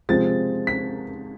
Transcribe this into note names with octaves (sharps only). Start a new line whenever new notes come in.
C3 F3 G#3 C4 A6
B6